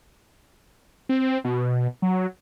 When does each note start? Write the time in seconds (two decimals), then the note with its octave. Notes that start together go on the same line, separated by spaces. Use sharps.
1.09 C4
1.44 B2
2.02 F#3